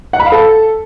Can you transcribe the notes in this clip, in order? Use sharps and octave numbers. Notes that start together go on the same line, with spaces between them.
F#5
B5
F5
A4